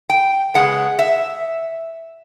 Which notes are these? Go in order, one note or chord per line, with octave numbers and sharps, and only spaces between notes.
G5
C#3 F3 G#3 B3 F#5
E5